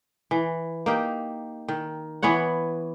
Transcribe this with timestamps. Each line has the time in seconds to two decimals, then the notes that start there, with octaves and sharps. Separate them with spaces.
0.31 E3
0.86 A#3 D#4 G4
1.68 D#3
2.23 E3 B3 C#5 F#5